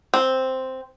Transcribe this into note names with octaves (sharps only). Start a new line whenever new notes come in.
C4